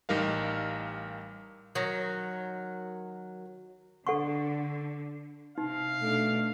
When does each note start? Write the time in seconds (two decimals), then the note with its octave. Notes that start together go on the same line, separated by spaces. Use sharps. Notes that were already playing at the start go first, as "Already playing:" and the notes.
0.09 A1 G3 D#4 A#4 F5
1.75 D#3 F#3
4.07 D3 A4 F#5 C#6
5.58 C3 D#4 F5
6.02 B2 A3 D4